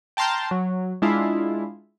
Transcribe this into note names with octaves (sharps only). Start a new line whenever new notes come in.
G5 A5 A#5 C6 F6 G6
F#3
G#3 D4 E4 F4